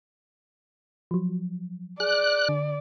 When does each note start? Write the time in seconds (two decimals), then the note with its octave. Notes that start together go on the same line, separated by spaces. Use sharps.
1.11 F3 F#3
2.00 G#4 D5 F#6
2.49 D3